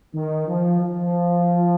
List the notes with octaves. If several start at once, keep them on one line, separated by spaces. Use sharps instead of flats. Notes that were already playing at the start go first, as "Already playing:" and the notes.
D#3
F3
F3